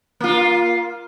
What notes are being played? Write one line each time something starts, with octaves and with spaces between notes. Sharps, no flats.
A#3 F4